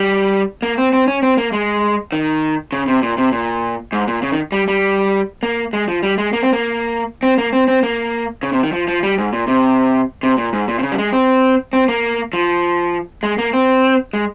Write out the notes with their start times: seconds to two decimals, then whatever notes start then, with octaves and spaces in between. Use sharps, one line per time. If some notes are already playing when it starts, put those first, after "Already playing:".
Already playing: G3
0.62 A#3
0.78 C4
0.93 C4
1.08 C#4
1.23 C4
1.38 A#3
1.53 G#3
2.12 D#3
2.72 C#3
2.88 C3
3.03 A#2
3.18 C3
3.32 A#2
3.93 G#2
4.08 A#2
4.23 C#3
4.32 D#3
4.52 G3
4.68 G3
5.43 A#3
5.73 G#3
5.88 F3
6.03 G3
6.18 G#3
6.33 A#3
6.43 C4
6.53 A#3
7.23 C4
7.38 A#3
7.53 C4
7.68 C4
7.83 A#3
8.43 C#3
8.53 C3
8.63 D#3
8.73 F3
8.88 F3
9.03 G3
9.18 G#2
9.33 A#2
9.48 C3
10.23 C3
10.38 A#2
10.53 G#2
10.68 A#2
10.79 C3
10.83 C#3
10.92 G3
10.98 G#3
11.13 C4
11.73 C4
11.88 A#3
12.33 F3
13.23 G#3
13.38 A#3
13.53 C4
14.13 G#3